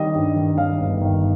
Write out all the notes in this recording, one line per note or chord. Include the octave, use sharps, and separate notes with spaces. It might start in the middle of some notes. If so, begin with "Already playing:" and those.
Already playing: D#3 G3 D#5
G2
D#3
D#3 F5
G1
D#3